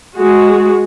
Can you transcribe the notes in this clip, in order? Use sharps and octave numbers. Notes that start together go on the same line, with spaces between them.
G#3 F#4